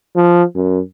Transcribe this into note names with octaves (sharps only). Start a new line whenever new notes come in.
F3
F#2